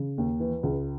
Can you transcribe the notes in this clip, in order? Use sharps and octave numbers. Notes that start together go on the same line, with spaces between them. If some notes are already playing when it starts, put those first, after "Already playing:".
Already playing: C#3
D#2
E3
C#2